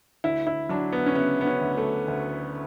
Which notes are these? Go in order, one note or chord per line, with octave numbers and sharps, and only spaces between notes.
D2 E4
E4
F#3 D4
B3
C#4
C#3 B3
B3
C#4
D2
A3
D2